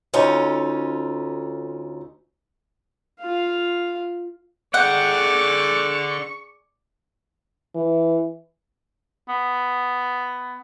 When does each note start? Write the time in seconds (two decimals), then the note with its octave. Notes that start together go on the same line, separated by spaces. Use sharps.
0.14 D2 C#4 D#4 F4 A4
3.21 F4 F5
4.74 D3 G#4 D5 F#5 G5 C#6
7.75 E3
9.29 B3